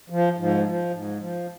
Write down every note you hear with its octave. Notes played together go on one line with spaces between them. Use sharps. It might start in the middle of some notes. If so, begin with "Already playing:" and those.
F3
G#2 F3
F3
G#2
F3